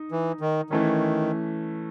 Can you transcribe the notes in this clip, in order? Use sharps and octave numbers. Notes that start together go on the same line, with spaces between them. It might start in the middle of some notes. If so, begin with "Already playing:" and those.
Already playing: D#4
E3
D#3
D#3 E3 A3 C#4